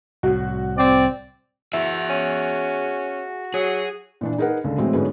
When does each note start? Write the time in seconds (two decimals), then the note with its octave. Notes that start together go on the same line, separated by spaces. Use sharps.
0.23 C2 A2 F#4
0.78 C4 D5
1.73 E4 F#4 G#4 E5
2.10 C#4
3.54 F#3 G#4
4.21 A#2 E3 D4
4.38 D#4 G#4 A#4 B4 F#5
4.64 C#2 D3
4.78 A2 E3 F#3 G#3 A3 C4
4.94 G#2 D3 F#3 G#3 B3 C#4